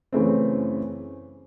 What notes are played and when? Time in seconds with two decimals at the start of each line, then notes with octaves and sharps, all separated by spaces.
0.13 F#2 C#3 E3 A3 C4